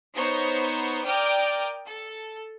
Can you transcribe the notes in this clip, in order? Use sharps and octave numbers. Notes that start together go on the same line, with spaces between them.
B3 D#4 C5 C#5 A#5 C#6
A#4 D5 G5 D6 D#6 F6
A4